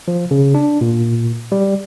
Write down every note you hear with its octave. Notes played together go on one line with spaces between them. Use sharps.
F3
C#3
D4
A#2
G3